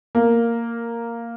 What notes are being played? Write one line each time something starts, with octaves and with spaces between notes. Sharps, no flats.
A#3